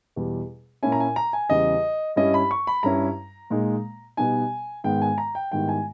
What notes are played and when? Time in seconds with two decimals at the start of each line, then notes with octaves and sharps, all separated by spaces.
0.16 E2 B2 G3
0.83 A#2 A#3 C#4 E4 G#5
0.92 A#5
1.00 G#5
1.16 A#5
1.33 G#5
1.50 E2 C#3 G3 D#5
2.16 G2 G3 C#4 E4 D#5
2.34 B5
2.51 C#6
2.67 B5
2.83 G2 G3 C#4 E4 A#5
3.50 A#2 G#3 D#4
4.17 B2 G3 B3 D#4 G#5
4.84 G#2 D#3 G#3 B3 G5
5.02 G#5
5.18 A#5
5.35 G5
5.52 G#2 D#3 G3 B3 E4 G5
5.69 G#5